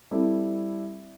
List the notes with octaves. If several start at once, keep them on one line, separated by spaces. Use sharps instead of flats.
G3 C4 E4 A4